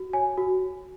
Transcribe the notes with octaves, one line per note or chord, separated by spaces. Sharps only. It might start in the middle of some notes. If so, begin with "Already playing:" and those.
Already playing: F#4
C#5 G#5
F#4